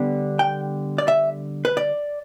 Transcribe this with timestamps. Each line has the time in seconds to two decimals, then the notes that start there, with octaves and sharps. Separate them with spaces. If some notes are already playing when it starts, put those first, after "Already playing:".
Already playing: D3 G3 B3
0.39 G5
0.98 D5
1.08 E5
1.65 B4
1.77 D5